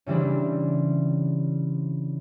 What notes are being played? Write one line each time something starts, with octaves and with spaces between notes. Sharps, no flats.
C#3 E3 G3 C4 D4